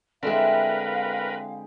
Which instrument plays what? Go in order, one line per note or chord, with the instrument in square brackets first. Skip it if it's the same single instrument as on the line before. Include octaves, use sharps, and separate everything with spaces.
[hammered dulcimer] D3 G#3 G4 [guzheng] C4 E4 [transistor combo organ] A#4 B4 [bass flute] F5